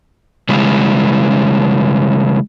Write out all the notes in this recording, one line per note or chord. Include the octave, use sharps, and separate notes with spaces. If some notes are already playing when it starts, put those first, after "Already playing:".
C#3 E3 G3 G#3